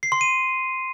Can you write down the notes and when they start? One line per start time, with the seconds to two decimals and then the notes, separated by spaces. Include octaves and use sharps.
0.03 C7
0.12 C6
0.21 D#7